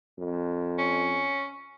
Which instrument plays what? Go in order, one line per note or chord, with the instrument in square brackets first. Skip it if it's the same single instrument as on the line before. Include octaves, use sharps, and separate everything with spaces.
[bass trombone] F2
[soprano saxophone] C#4